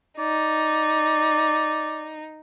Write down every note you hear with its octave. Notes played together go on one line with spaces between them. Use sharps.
D#4 D5